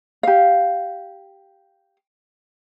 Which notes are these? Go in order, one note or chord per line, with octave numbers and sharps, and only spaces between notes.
G4 F5